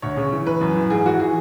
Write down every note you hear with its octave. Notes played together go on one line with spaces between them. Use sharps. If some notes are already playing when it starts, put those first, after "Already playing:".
D2 C#5
C#3
E3
E3 B4
F#2
E3
G#2 G#4
E3 F#4
E3 G#4